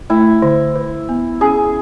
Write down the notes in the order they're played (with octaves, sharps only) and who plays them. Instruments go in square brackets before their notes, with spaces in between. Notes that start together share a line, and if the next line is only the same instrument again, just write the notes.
[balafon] A3 [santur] E4
[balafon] D3
B4
B3
[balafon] C#4 [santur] G#4